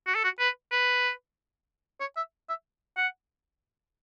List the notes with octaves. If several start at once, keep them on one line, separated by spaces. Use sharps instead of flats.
F#4
A4
F#4
B4
B4
C#5
E5
E5
F#5